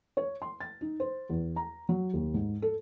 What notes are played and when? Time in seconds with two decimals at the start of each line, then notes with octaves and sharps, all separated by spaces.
0.17 C#5
0.42 C6
0.60 A6
0.81 D#4
1.00 C5
1.29 E2
1.56 A#5
1.89 F#3
2.13 D#2
2.34 G#2
2.62 A4